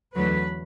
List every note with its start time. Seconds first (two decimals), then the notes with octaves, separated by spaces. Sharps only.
0.15 E2 D3 F#3 A3 B4